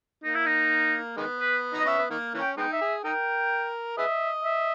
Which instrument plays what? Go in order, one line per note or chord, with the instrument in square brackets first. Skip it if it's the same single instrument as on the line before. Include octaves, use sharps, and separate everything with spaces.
[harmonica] A#3 [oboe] D#4
[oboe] E4
D#4
[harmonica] D#3 G#3 B3
[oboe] B4
[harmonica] D#4
[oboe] D#5
[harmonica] C#4 [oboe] E5
[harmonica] B3
D#3 A#3
E3 A#3 C#4
[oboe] G5
[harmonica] G#3 B3 D#4 [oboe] G5
[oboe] E5
[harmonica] G#4
[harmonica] D#4 A#4 [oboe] G5
[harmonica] G#4 B4 D#5 [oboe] E5
[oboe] E5